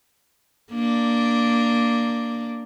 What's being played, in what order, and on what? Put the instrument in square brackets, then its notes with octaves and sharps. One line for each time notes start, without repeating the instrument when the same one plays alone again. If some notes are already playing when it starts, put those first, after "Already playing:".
[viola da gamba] A#3 D4